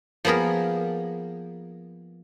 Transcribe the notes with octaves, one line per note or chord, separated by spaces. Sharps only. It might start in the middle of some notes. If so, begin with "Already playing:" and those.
F3 A#3 B3 G#4 A#4